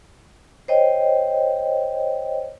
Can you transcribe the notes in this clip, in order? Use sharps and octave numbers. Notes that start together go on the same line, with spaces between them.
C5 C#5 D#5 G5